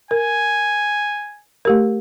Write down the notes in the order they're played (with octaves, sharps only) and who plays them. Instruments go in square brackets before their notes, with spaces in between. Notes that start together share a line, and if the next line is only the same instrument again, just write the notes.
[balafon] A#4 [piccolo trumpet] G#5
[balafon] A3 G4 A#4